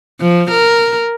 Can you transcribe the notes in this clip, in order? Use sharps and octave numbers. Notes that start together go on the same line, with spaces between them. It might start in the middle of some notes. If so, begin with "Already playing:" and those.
F3
A#4